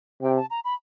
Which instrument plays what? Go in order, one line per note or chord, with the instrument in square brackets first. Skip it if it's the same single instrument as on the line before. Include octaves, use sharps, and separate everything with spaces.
[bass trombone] C3 [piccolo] G5
[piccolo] A5
A#5
B5